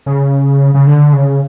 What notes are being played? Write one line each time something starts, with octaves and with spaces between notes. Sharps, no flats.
C#3
C#3
D3
C#3